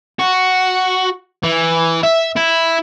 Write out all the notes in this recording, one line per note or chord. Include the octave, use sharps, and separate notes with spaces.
F#4
E3
E5
E4